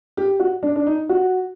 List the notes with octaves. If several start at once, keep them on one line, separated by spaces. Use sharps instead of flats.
G4
F#4
D4
D4
D#4
F#4